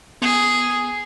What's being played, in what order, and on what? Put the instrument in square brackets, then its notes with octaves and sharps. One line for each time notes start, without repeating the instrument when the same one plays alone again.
[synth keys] B3 [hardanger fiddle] G#4